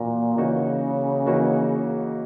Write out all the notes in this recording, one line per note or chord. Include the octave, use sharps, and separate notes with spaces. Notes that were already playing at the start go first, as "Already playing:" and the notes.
Already playing: A#2 E3 A#3 F#4
C#3 E3 A#3 D#4 F#4
E3 A#3 D#4 F#4